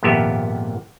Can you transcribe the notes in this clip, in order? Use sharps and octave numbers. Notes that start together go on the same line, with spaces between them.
G#1 F2 A#2 B3 G4 E5